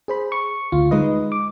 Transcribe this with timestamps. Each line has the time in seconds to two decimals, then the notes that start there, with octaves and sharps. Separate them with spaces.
0.08 G#4 C5 B5
0.32 C#6
0.72 D2 F4
0.91 G#3 D#4 B4 D#5
1.32 D6